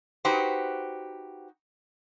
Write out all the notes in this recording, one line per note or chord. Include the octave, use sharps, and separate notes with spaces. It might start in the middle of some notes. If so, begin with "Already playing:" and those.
D#4 F#4 G4 B4 C5